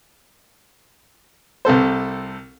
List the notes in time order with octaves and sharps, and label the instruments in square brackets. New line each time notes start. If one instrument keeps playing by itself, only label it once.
[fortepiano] C2 C3 A4 C5